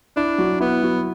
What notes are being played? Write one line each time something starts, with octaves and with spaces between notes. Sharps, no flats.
D4 E4
F#3
B3 E4
F#3